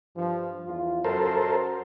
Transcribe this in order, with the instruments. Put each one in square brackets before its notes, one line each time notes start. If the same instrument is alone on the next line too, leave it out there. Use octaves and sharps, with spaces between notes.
[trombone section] G2 F3
E2 F4
[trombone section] F#2 [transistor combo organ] A4 A#4 C5